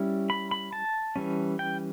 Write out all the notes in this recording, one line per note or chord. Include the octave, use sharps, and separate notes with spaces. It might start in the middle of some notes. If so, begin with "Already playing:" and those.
Already playing: G3 C#4 E4
B5
B5
A5
E3 G3 C#4
G5